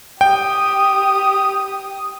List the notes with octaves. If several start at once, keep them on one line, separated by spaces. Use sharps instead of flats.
G4 G5 D#6